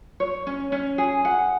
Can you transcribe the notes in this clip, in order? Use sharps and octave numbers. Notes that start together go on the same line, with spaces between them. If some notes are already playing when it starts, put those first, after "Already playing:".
C#5
C#4
C#4
G#4
F#5